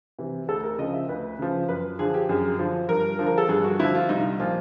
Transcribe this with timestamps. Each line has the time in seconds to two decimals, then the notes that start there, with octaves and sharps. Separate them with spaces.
0.19 C3 E3
0.48 D2 A4
0.63 A#4
0.78 C#3 F3 D#5
0.94 E5
1.08 D2 B4
1.39 C#3 F3
1.69 F#2 B4
1.99 D3 F3 G#4
2.14 G4
2.29 F#2 G#4
2.59 D3 F3
2.89 G2 A#4
3.19 D3 F3
3.26 A#4
3.38 A4
3.49 G2 G#4
3.64 F#4
3.79 D3 F3 E4
3.95 F4
4.09 C2 D#4
4.40 A#2 F3 F4